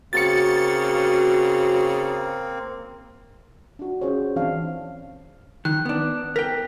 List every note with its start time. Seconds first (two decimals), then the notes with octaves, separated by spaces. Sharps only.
0.13 C#3 A#3 C4 F#4 A6 C#7
3.79 D4 F#4
4.01 C#4 F4 G#4 C5 C#5
4.36 E3 C4 D4 F5
5.65 D#3 F#6
5.85 B3 D4
6.36 A#4 G5 B6